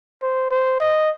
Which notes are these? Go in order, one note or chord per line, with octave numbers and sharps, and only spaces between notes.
C5
C5
D#5